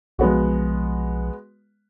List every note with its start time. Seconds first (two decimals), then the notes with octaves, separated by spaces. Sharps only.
0.19 B1 F3 G#3 B3 F#4